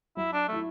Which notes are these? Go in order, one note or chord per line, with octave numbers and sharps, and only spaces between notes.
F#3 E4
D4
A3 E4